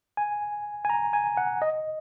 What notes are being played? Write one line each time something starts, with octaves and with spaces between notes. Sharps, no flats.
G#5
G#5
A#5
G#5
F#5
D#5